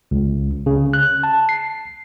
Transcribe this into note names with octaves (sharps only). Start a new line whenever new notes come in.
C#2
C#3
F#6
A5
C7